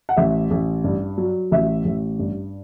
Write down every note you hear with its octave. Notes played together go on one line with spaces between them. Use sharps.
F#5
A1 E5
A1
G2
F#3
A1 E5
A1
G2